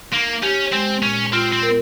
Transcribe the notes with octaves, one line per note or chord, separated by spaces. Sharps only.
A#3 D#4
C#4 G4
G#3 C4
A#2 C#4
C4 F4
C4
A#4